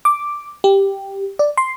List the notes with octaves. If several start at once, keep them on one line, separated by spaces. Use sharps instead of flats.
D6
G4
D5
C6